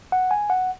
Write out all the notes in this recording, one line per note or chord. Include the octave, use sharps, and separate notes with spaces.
F#5
G#5
F#5